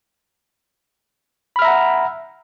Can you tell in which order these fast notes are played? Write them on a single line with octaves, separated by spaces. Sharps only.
B5 F6 E5 A#5 F#5